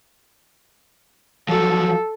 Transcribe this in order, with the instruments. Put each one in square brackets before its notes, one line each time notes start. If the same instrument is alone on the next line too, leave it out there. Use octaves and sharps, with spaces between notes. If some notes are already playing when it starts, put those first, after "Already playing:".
[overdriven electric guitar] F3 F#3 [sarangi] A4